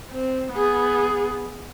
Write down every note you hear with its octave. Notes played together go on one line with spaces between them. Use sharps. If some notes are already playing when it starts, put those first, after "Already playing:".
C4
B3 G#4